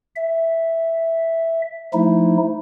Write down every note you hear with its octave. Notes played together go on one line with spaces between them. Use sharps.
E5
F3 A3 D#4 E4